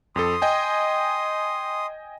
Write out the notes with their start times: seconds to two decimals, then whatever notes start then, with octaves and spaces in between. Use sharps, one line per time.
0.16 F2 A4 C6 D#6
0.42 D#5 G5 G#5